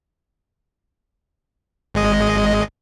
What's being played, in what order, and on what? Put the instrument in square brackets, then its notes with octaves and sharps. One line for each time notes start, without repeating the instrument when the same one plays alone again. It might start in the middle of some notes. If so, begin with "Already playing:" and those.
[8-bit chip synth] G#1 G#3 D#5